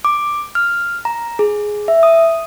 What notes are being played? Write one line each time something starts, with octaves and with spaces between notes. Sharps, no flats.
D6
F6
A#5
G#4
E5
D#6